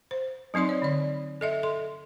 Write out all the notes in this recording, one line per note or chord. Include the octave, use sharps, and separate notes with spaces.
C5
F#3 C4 D#4 D5 C6
C#5
D3 D5
A4 D#5 E5
A4 C6